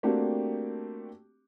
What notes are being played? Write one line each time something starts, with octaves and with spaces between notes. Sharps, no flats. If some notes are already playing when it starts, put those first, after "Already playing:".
A3 A#3 C4 D4 F#4 G4